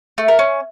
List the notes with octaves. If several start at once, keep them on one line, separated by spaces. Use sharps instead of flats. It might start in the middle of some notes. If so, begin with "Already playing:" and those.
A3
A#4
C#4